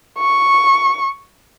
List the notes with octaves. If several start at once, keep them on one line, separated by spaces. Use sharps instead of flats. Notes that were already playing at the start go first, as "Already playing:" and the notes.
C#6